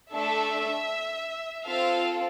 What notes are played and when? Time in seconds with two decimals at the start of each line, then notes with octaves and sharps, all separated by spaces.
0.12 A3 D4 A4 E5
1.68 C4 F4 A4 F5